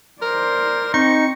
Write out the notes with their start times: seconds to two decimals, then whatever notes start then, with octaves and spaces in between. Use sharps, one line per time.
0.22 A#4 C5 D5
0.94 C4 D#4 C#6